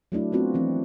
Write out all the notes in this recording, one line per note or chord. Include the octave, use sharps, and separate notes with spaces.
F#3 A3 D4 E4
A3 B3 C4 F4 F#4
E3 F3 C4